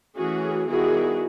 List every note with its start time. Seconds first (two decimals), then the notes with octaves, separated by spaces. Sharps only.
0.16 E3 A3 C#4 F#4 G#4
0.69 D#3 G3 B3 E4 F#4 G#4